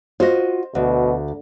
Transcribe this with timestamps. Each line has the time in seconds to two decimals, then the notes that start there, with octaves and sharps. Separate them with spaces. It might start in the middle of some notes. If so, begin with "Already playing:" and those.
0.20 F4 F#4 C5 D#5
0.75 D2 B2